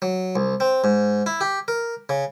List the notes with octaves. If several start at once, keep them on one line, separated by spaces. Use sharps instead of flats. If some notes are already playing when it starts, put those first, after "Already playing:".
F#3
C2
C4
G#2
E4
G4
A#4
C#3